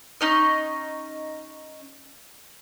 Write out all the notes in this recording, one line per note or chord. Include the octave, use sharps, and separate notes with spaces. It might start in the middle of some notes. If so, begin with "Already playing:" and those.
C#4 D#4 D#5